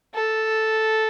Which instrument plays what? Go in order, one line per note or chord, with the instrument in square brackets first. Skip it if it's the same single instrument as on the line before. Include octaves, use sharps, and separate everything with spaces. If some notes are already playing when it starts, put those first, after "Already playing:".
[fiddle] A4